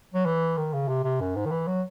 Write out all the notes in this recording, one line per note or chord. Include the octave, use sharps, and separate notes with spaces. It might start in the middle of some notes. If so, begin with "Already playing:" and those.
F#3
E3
D#3
C#3
C3
C3
F#2
G#2
D#3
E3
F#3